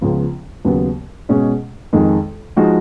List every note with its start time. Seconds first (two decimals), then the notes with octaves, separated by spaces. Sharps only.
0.01 C#2 C#3 F3 B3 F4
0.65 D#2 C#3 F#3 B3
1.29 B2 G#3 C#4 G#4
1.93 F2 D#3 G#3 D#4
2.57 F3 G#3 D#4 F#4